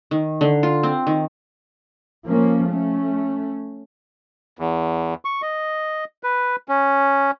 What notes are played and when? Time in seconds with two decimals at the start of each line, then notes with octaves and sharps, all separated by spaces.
0.11 D#3
0.41 D3
0.63 F4
0.83 C4
1.07 D#3
2.26 F3 A#3 C#4
2.69 A3 C#4
4.59 E2
5.25 C#6
5.42 D#5
6.23 B4
6.69 C#4